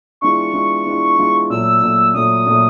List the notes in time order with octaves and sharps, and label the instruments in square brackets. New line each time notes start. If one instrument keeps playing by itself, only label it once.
[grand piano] E3 G#3 B3 D4 F4 [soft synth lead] C#6
[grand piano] E3 G#3 B3 D4 F4
E3 G#3 B3 D4 F4
E3 G#3 B3 D4 F4
[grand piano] A#2 F#3 A3 [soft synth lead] E6
[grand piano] A#2 F#3 A3
[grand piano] A#2 F#3 A3 [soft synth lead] D#6
[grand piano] A#2 F#3 A3